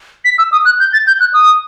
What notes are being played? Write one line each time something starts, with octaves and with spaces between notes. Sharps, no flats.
B6
E6
D#6
F#6
G6
A6
G6
F#6
D#6